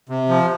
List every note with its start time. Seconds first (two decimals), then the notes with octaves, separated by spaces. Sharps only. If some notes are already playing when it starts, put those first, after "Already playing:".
0.09 C3
0.29 F3